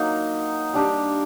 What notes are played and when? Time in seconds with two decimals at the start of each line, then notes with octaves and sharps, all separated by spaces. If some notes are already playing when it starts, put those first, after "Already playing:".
Already playing: F#3 A#3 D#4
0.74 G3 D4 G4